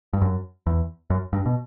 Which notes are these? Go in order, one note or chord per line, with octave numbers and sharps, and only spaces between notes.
G2
F#2
E2
F#2
G2
B2